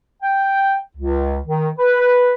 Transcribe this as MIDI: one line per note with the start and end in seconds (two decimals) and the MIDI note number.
0.23 0.76 79
0.97 1.37 37
1.46 1.69 51
1.79 2.32 71